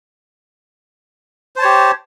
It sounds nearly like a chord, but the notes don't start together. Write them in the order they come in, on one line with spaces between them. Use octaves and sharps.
C5 A5 C#5 G4